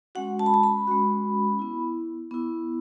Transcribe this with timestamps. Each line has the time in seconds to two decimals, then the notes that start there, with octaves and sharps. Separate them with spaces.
0.15 G#3 C#4 F#4 F#5
0.39 A5
0.46 B5
0.54 A5
0.63 B5
0.87 G#3 C#4 F#4
1.59 B3 E4
2.31 B3 E4